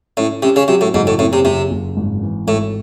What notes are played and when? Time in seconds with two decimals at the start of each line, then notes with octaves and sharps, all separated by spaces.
0.17 A2 C#4
0.42 C3 C#4
0.56 C#3
0.68 C3 F#3
0.81 A2
0.94 F#1 G#2
1.07 A2
1.19 A2 C4
1.33 C3
1.45 F#1 C3
1.71 F#1
1.97 G#1
2.22 E3
2.47 G#1 A2